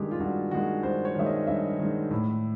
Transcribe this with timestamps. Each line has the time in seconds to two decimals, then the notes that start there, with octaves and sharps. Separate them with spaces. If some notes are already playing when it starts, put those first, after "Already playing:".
Already playing: G2 D#3 G#3 G4
0.11 F4
0.20 G2 F#4
0.51 D#3 G#3 F#4
0.83 G2 C5
1.05 C#5
1.15 D#3 G#3 E5
1.26 D#5
1.47 G2 E5
1.79 D#3 G#3
2.11 A2